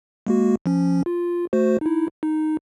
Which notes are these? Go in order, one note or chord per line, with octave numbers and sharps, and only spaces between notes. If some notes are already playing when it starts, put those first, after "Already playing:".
G#3 A#3 F#4
F3 C#4
F4
A3 F#4 C5
D#4 E4
D#4